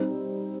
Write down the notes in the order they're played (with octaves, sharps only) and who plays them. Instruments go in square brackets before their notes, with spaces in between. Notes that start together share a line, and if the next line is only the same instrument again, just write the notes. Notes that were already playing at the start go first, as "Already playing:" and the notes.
Already playing: [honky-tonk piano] G3 C4 D#4